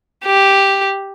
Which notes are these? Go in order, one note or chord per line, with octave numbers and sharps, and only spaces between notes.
G4